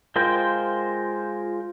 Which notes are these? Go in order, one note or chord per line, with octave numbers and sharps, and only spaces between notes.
G#3 F4 A#4 C5 G5